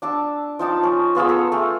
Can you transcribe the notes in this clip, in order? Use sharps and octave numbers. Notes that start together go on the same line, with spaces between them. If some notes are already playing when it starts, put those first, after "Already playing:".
D4 A5 D6 E6
F3 D#4 A5 D6
C#4
B3 F4 G#4 E6
A4 A#5
A3 G#4